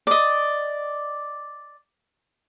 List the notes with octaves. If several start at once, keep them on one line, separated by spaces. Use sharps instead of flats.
D5 D#5